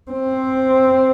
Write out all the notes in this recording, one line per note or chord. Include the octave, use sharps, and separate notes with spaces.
C4